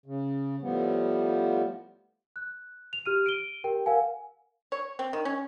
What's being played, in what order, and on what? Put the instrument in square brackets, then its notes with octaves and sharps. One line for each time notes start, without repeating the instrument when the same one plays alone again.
[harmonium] C#3
A2 F3 G3 B3
[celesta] F#6
F7
G4 F6 D#7
D7 D#7 G7
G4 A#4 G5
A#4 F5 F#5 G#5
[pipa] C#5
C4
D#3
C#4